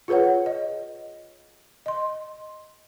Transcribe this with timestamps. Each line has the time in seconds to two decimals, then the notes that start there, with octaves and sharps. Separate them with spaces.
0.08 F4 G#4 B4 C#5 F#5
0.46 D#5
1.86 D#5 C6